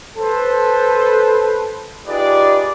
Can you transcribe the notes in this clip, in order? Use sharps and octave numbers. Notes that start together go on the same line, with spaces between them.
A4 B4 C5
D#4 F4 G4 G#4 B4 D5